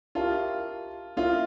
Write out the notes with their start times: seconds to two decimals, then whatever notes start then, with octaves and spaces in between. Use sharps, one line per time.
0.15 F4 G4 A#4 E5 A5
1.17 A#3 C#4 E4 F4 A#4 E5